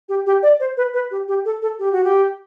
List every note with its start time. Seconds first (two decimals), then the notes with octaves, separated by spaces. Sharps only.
0.09 G4
0.26 G4
0.43 D5
0.60 C5
0.77 B4
0.94 B4
1.11 G4
1.28 G4
1.45 A4
1.62 A4
1.79 G4
1.92 F#4
2.04 G4